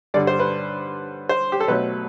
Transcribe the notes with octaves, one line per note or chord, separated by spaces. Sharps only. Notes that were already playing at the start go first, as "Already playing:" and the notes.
G2 D3 G3 D5
C5
B4
C5
G4
A4
B2 F#3 A3 B4